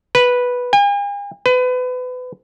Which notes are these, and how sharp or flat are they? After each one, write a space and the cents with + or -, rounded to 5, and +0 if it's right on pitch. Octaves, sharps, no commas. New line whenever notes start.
B4 -5
G#5 -45
B4 +30